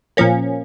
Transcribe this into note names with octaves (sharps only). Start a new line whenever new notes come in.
A#2 F3 A#3 C#4